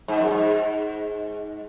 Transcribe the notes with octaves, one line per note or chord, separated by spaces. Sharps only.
G#2
F#2
G#2